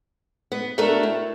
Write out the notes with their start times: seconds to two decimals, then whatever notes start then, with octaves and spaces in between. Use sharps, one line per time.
0.52 B3
0.78 A3 D4 F#4 A4 A#4
1.03 A2